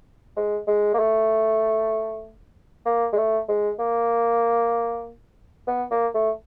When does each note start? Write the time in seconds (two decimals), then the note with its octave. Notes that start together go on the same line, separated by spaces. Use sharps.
0.37 G#3
0.67 G#3
0.94 A#3
0.99 A3
2.86 A#3
3.13 G#3
3.17 A3
3.49 G#3
3.79 A#3
5.67 B3
5.91 A#3
6.14 A3